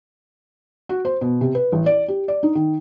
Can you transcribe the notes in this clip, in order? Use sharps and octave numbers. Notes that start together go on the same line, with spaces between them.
F#4
C5
B2
C3
B4
A1
D5
G4
D5
D#4
D#3